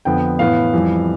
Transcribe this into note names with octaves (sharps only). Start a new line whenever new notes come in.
F2 D3 F3 B3 G5
A2 E3 B3 F5
F2 E3 G3